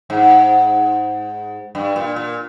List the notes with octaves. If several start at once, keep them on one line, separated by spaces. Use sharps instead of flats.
G#2
G2
A#2
A#2